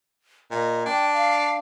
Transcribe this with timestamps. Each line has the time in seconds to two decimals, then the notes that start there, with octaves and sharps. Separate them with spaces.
0.51 A#2 D#5
0.86 D4 G5
1.14 F5